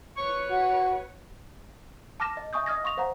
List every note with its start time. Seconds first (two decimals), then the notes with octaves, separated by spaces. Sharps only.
0.17 B4 C#5 C#6
0.49 F#4
2.20 A5 D6 F6 A#6 E7
2.37 D#5
2.53 D#5 E5 G#5 C#6 D#6 G6
2.66 D#5 D#6 F6 G#6 A#6
2.84 F5 C6 C#6 D#6 A#6 F7
2.97 C5 F5 F#5 A#5